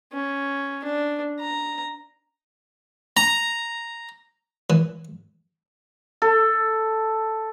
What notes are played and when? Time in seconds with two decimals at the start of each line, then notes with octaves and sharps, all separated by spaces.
0.12 C#4
0.84 D4
1.40 A#5
3.17 A#5
4.70 E3
6.22 A4